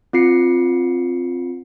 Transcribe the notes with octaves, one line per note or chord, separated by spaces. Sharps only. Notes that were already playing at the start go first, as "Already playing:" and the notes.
C4 F4 C7 C#7